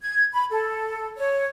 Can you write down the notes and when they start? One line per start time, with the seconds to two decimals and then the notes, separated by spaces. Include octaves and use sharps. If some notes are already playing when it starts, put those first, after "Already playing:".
0.02 G#6
0.33 B5
0.51 A4
1.17 C#5